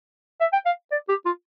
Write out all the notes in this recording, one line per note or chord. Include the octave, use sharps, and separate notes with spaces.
E5
G5
F5
D5
G4
F4